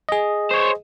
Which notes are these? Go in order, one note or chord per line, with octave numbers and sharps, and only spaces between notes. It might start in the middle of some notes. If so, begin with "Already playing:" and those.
G#4 D#5
C5 C#5